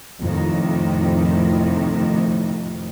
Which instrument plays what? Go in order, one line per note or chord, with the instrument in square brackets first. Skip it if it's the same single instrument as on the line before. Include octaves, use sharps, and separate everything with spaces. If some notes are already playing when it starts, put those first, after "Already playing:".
[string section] F2 A2 C3 D#3